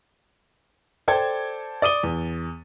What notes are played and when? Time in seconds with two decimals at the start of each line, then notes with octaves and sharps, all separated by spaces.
1.08 A4 C5 D5 G5 A5 G#6
1.82 D5 D#6 D#7 G7
2.03 E2